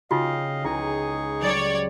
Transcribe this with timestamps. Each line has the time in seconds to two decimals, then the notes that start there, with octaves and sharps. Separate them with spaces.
0.11 C#3 D#4 F4 F#4 D#5 F5 G5
0.64 C#2 D#4 E4 G#4 C#6
1.42 F#3 G3 C#5 D5